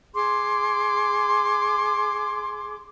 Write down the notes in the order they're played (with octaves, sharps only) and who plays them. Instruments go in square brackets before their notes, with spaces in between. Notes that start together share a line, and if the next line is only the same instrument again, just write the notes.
[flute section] G#4 C6 D6